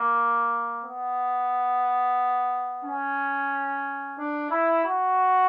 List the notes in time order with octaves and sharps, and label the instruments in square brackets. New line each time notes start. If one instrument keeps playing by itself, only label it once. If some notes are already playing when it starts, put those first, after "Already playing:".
Already playing: [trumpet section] A#3
B3
C#4
D4
E4
F#4